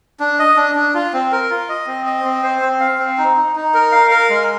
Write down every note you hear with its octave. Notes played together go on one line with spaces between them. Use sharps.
D4
D#5
D4
D4
F4
C4
A#4
F4
D#5
C4
D#5
C4
C5
C4
F5
C4
D#4
D#4
D#4
A#4
F5
A#4
G#3